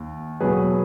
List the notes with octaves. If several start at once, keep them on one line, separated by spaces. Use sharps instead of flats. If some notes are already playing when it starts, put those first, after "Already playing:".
Already playing: D#2
E2 B2 F#3 G#4 B4